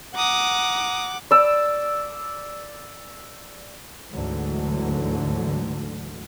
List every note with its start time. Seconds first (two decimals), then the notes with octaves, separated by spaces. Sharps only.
0.15 F#5 A#5 D6 D#6
1.31 D5 E6
4.13 D2 G#2 D3 E3 F#3